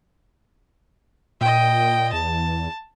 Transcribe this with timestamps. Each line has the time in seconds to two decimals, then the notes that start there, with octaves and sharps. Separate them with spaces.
1.41 A#2 D#5 G5
2.13 E2 A5